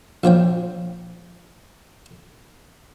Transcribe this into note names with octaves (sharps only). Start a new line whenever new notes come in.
A#1 F3 C#5 G5